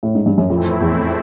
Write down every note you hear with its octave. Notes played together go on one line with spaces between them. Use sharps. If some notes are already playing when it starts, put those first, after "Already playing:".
A2
G#2
G2
F#2
F2 A2 E3 A3 C4 E4
E2